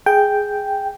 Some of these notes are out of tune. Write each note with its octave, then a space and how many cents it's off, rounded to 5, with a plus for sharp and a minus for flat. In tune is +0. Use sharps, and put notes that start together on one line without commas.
G#4 +0 G5 +0